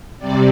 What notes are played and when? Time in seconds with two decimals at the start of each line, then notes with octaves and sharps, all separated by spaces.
0.19 C3 G3 D5